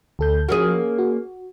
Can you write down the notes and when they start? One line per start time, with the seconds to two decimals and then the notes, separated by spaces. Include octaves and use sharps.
0.19 D2 A4 G6
0.49 F3 A#3 C#4 F#4 G#4
0.98 F#4